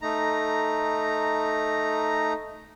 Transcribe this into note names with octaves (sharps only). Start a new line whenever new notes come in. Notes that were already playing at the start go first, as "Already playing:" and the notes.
A3 D#4 A#5